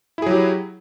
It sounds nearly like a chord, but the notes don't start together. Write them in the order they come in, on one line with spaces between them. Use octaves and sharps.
E4 G#4 F#3 G4